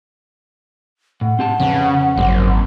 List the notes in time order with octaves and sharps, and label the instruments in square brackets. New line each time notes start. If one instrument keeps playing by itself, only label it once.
[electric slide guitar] A2 [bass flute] F#5
[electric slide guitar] C4 G4 A5
[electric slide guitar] F2 C#4 B4 [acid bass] C#3
[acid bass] G#1 [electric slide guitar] F#2 A#3 C4